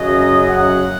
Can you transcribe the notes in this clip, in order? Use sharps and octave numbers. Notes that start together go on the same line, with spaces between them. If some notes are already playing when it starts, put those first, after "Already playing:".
Already playing: F#2 C#3 F#3 D#5
F#5